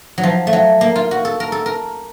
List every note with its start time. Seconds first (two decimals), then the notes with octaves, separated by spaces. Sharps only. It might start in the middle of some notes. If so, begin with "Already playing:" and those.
0.18 F#3
0.23 F3
0.47 A3
0.53 F#3
0.81 A#3
0.96 F4
1.11 F#4
1.25 A4
1.40 A#4
1.52 A4
1.66 A#4